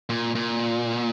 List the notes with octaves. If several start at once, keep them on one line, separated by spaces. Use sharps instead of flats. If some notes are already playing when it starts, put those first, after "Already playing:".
A#2
A#2